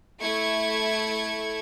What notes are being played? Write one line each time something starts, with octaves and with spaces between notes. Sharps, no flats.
A3 E4 C#6 G#6